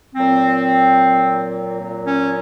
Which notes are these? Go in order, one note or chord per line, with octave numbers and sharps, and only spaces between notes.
A#2 F#3 C4
A#2 F#3
C#4